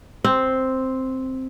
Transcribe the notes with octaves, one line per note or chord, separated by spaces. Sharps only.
C4